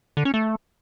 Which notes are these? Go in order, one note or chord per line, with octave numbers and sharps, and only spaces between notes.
D3
C#4
A3